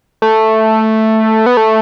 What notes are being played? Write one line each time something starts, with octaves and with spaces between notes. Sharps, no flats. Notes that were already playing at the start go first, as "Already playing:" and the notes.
A3
B3
A3